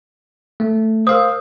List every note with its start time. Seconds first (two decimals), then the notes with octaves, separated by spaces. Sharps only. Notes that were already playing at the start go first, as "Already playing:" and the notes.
0.60 A3
1.07 A#4 C5 F5 D#6